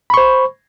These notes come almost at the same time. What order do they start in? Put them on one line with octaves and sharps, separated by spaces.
B5 C#6 C5